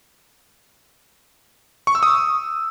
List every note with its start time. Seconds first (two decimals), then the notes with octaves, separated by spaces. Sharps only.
1.87 C#6
1.95 E6
2.03 D#6